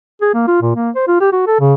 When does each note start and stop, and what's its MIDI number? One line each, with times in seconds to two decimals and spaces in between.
0.21 0.31 68
0.34 0.43 58
0.48 0.61 65
0.62 0.71 46
0.76 0.90 58
0.95 1.07 72
1.08 1.17 65
1.21 1.29 67
1.32 1.44 66
1.47 1.55 69
1.60 1.74 49